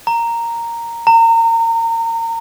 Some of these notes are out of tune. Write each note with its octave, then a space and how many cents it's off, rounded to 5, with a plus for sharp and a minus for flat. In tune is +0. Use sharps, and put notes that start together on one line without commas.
A#5 -5
A#5 -30